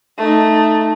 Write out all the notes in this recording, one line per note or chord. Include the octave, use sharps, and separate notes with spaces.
A3 D#4